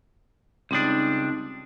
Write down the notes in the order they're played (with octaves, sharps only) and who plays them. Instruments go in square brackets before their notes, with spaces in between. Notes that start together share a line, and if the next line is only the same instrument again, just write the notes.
[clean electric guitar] C#2 G3 D4 [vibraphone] C4 D#4